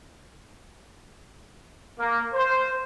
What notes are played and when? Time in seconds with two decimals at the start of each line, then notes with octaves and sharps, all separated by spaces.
2.00 A#3
2.34 C5